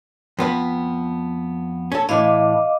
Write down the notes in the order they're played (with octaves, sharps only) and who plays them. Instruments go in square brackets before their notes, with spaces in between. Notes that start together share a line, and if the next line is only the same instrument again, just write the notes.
[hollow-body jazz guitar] F2 B3 B4
C#4 A4
[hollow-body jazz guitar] A2 E3 [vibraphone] D#5 F5 D6